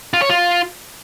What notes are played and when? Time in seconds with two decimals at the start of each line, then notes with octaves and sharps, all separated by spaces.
0.14 F4
0.22 C#5
0.30 F4